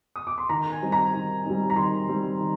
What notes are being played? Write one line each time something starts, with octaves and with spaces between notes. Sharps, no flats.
D#6
D6
C6
D#3 A#5
G#5
G3 C4 D#4
A#5
D#3
G3 C4 D#4
A#5
D#3 C6
G3 C4 D#4
D#3